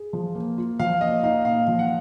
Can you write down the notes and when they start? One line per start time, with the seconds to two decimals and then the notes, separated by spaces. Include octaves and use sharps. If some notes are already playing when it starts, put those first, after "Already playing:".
Already playing: G#4
0.13 F3
0.35 A#3
0.58 F4
0.79 F3 F5
1.01 A#3 D#5
1.23 D#4 F5
1.45 A#2 F5
1.68 F3
1.79 F#5